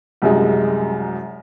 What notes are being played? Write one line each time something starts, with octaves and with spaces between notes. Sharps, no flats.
C2 F#2 G#3